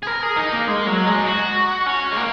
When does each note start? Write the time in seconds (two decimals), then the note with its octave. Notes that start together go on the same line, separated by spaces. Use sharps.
0.03 G#4
0.07 A#4
0.23 G#4
0.37 D#4
0.52 A#3
0.68 G#3
0.87 F#3
1.07 G#3
1.18 D#4
1.27 F#4
1.86 C#4
2.12 G#3
2.17 A#3